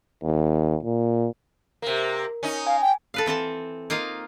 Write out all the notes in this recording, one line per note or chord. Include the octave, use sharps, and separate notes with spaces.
D#2
A#2
C3 A#3 A#4
C#4 D#4
F5 G#5
G5
A4 B4 F5
E3 C4 A4 A5
A#3 D#4 F4 F5